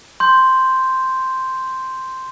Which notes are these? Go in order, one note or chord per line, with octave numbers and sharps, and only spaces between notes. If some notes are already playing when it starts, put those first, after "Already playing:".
C6 G6